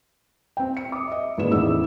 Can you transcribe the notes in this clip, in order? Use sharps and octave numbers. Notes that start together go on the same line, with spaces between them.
C4 G5
C#7
D6 D#6
D#5 E5
A1 A#2 D#3 G#4 B4 E7
D#1 A1 E2 D#4 E4 E6